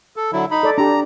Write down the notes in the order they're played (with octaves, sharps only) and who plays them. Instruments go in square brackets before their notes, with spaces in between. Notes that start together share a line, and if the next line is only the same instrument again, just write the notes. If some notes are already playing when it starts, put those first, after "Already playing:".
[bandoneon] A4
D3 F#3 E4
D#4 B5
[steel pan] A4 D5
[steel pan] D4 G4 [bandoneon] A#5